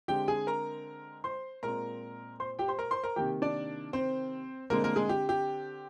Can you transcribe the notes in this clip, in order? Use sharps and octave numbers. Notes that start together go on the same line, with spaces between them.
D3 G#3 C4 G4 G5
G#4 G#5
A#4 A#5
C5 C6
A#2 G#3 C4 A#4 A#5
C5 C6
G4 G5
C5 C6
A#4 A#5
C5 C6
A#4 A#5
C3 D#3 A#3 G4 G5
D4 D5
C4 C5
D3 G#3 A#3 C4 A#4
A#3 A#4
G#3 G#4
G4
G4